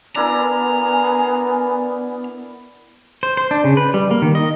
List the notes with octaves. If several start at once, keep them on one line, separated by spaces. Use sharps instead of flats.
B3 D4 E4 A#4 G#5 A#5
C5
C5
D4
C#3
B4
G3
A#3
D#3
D#5